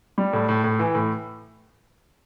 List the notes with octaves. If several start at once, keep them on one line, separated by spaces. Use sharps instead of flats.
G3
A2
A2
A2
E3
A2